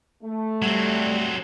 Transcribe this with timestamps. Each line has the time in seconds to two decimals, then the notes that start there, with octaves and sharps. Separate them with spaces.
0.24 A3
0.62 F#3 G3 C4